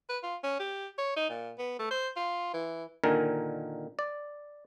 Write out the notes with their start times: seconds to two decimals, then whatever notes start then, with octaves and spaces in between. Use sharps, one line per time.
0.09 B4
0.23 F4
0.43 C#4
0.59 G4
0.98 C#5
1.16 D#4
1.29 A#2
1.58 B3
1.79 A3
1.91 C5
2.16 F4
2.54 E3
3.04 A#2 D3 D#3 A#4 G#5
3.99 D5